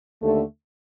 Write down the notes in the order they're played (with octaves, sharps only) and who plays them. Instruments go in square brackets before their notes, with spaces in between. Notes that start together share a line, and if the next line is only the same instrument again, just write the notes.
[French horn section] D#2 D3 A3